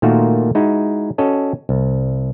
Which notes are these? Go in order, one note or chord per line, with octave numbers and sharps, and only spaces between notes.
A#2 D#3 A3 A#3 F4 F#4
G#3 D#4 E4 F#4
C#4 F#4 A4 D#5
C2